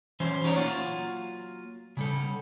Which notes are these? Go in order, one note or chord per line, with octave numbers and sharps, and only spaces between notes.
E3 F#3 C#4 C5
C#4 D#4 G4 C#5 D5 A#5
F#3 A#3 F4 F#4
C#3 G3 A4